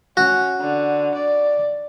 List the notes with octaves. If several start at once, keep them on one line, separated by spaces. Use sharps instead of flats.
C#4 F#4
D3
D5